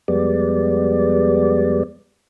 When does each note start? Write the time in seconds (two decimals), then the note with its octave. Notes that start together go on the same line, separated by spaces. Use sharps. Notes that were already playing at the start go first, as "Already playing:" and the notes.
0.08 F2 G3 G#3 B3 D5